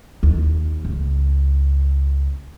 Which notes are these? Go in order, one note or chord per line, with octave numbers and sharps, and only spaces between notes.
D#2
C#2